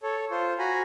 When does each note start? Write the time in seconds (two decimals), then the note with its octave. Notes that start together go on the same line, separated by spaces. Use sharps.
0.03 A4 C#5
0.31 F4 C5
0.59 F#4 G#5 A#5 B5